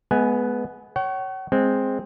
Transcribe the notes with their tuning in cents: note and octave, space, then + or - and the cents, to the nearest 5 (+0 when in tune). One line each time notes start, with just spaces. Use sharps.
G#3 +35 B3 +0 G#5 +0
C#5 +0 F#5 +45
G#3 +0 C4 +0